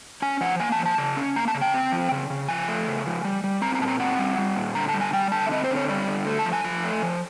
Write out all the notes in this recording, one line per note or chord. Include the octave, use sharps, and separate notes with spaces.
C#4 G#5
F3 F#5
A#3 G#5
A5
F3
A5
C#3
C#4
A#3 A#5
A5
C#3
G5
C4
F3
C#3
C#3
F3 G#5
A3
C#3
F3
G3
G3
C4 A#5
A#5
A#2 A5
A#5
C4 F#5
G3
G3
A#2
D3 A#5
A5
G3
G#5
G3 G5
D3 A5
E5
C4 D#5
C5
D3
C#5
G3 D5
D3
A3
A5
F3
G#5
F3
A3
F3